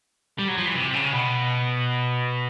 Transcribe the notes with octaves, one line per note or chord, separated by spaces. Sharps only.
G3
F#3
F3
E3
C3
C#3
B2